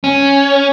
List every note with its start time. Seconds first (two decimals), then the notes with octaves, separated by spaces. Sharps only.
0.04 C#4